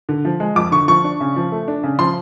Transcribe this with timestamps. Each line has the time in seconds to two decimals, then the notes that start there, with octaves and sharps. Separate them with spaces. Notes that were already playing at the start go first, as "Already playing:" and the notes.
0.09 D3
0.25 F3
0.40 G#3
0.56 F2 D6
0.72 D3 C#6
0.88 F3 C#6
1.04 D4
1.20 C#3
1.36 F3
1.52 A3
1.68 D4
1.83 C#3
1.99 F3 C6